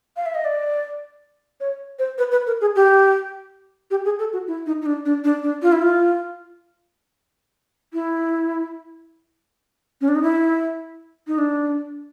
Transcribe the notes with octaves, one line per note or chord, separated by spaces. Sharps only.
F5
E5
D#5
D5
C#5
C5
B4
B4
A#4
G#4
G4
G4
G#4
A4
F#4
E4
D#4
D#4
D4
D4
D4
D4
F4
E4
F4
E4
C#4
D4
D#4
E4
D#4
D4